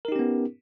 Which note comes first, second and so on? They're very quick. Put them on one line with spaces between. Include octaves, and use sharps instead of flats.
A#4 D#4 G4 C#4 B3